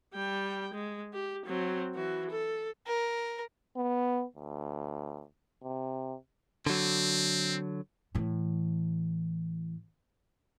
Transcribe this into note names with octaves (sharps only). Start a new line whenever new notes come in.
G3 G5
G#3
G4
F#3 C4
E3 F#4
A4
A#4
B3
D2
C3
D3 F#3 C4
A2 E3